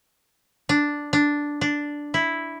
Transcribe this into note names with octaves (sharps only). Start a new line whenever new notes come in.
D4
D4
D4
E4